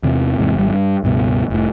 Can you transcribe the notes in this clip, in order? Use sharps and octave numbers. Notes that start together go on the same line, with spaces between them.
E2 C3 E3
E2 G#2 C3
G#1 G3
G2
C#2 G2 B2
F1 A2